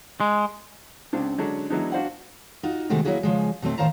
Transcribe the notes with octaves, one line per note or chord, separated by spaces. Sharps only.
G#3
C#2 C#3 C4 D4
D3 F#3 G#3 C#4 D4
E3 F#3 G#3 B3 D4 D#4
D4 F#4 C5 F5 F#5
D#4 F4 F#4
C3 D#3 G#3 A3 F#4 G4
F#3 A#3 E4 F#4 G#4
C#3 F3 G#3
B2 F#3 A3 C4
A2 D#3 C5 F5 A5 A#5